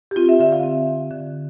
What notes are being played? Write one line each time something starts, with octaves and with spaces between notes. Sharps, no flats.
G4
C4 F4
E5
D3 E5
F5
C4
D3
D3